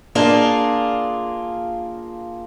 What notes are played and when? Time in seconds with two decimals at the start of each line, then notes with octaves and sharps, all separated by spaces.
0.15 A#3 D4 F4 G#4